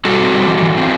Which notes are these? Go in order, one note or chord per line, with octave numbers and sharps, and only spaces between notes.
G3 F#4 A4
C4
G3
E3
E3
C4